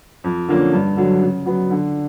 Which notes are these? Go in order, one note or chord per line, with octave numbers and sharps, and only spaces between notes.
F2
D3 F3 A#3 C#4
G2
D3 F#3
C#3
F#3 B3
D3